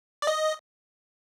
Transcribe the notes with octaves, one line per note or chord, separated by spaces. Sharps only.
D5
D#5